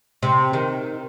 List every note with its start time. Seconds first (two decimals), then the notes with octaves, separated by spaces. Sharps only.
0.23 C3
0.53 D#3